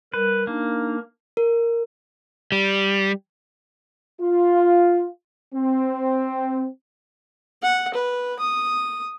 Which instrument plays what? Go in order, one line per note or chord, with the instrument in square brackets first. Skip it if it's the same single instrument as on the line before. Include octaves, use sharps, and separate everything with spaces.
[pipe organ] G3 A#4 [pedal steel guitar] B4
[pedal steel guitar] A#3 [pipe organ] D4 D#4
[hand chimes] A#4
[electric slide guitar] G3
[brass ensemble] F4
C4
[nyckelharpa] F#5
B4
D#6